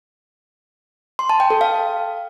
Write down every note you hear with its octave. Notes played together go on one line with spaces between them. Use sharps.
C6
A5
G5
A4
F5